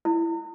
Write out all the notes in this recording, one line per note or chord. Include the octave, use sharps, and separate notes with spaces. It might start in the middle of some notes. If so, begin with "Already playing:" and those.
E4